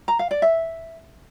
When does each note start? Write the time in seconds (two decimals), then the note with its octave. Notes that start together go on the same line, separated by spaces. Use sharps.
0.08 A#5
0.19 F5
0.31 D5
0.42 E5